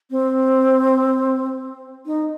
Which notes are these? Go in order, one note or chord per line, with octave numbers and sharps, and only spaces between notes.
C4
D#4